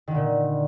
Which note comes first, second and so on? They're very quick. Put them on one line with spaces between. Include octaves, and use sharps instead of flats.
D#3 D3 A#2